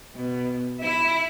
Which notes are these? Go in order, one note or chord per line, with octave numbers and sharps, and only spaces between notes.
B2
E4 E5